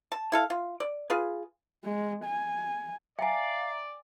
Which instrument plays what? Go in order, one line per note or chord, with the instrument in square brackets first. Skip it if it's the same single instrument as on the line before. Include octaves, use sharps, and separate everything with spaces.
[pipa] A5
E4 A4 F5
F4
D5
F4 G#4 B4
[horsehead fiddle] G#3
G#5
[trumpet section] D5 [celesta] E5 A#5 [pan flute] F5 [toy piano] G5 G#5